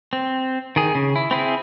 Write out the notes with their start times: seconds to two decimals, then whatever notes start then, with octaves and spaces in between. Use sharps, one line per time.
0.13 C4
0.76 D#3 G#4
0.95 C#3
1.16 E4
1.31 C4 E4 G#4